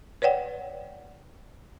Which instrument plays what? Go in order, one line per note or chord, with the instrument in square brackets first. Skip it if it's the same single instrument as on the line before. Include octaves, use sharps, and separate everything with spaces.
[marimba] B4 C#5 D5 F#5 G5